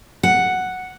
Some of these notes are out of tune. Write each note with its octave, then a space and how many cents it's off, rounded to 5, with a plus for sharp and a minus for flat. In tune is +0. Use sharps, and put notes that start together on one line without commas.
F#5 +0